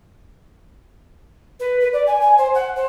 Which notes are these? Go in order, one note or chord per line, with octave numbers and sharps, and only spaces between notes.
B4
B4
D5
G#5
G#5
C5
F#5
C5